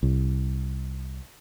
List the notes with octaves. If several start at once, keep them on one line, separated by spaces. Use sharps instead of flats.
C2